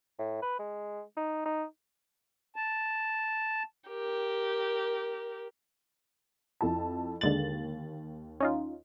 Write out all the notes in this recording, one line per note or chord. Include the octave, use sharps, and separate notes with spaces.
A2
B4
G#3
D#4
D#4
A5
G4 A#4
F2 E4 A5
D#2 D3 G#3 A6 F#7
C#4 D#4 F4